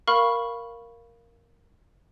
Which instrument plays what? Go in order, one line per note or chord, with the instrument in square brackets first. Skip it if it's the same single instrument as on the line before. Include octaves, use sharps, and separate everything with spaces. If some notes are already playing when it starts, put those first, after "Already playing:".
[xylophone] A#4 F5 B5 C#6 F6